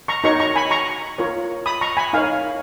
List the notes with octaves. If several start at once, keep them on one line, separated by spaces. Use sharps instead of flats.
A#5 C#6
D#4 F#4 A#4 C#5 A#5 C#6
A#5 C#6
G#5 B5
A#5 C#6
F4 A#4 C#5
B5 D#6
A#5 C#6
G#5 B5
D#4 A#4 C#5 F5 G#5